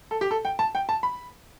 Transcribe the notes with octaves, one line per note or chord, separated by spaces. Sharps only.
A4
G4
A4
G5
A5
G5
A5
B5